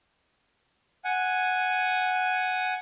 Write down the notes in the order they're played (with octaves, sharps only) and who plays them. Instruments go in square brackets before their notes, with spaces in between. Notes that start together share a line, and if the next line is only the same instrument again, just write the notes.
[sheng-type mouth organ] F#5 G#5